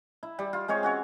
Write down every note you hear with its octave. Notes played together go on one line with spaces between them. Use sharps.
E4
G3
F4
G#3 C4 F4 C#5
C#4 F#4 C#5